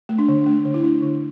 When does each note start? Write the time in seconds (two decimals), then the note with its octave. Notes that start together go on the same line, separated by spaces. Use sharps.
0.09 A3
0.18 D4
0.28 D3
0.46 A3 D4
0.65 D3
0.74 E4
0.84 D4
1.02 D3